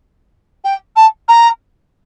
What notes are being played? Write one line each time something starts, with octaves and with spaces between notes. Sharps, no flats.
G5
A5
A#5